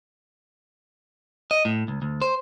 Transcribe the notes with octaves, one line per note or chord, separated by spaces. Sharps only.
D#5
A2
C#2
D2
C5